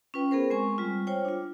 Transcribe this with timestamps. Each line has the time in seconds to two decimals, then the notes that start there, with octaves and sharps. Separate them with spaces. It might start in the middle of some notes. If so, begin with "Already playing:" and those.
0.14 C#4 F4 B4 G5
0.31 B3 G#4 A#4 C5
0.50 G#3 C4 G#5 C#6
0.78 G3 F4
1.07 F4 C5 C#5 G5
1.25 D4 F4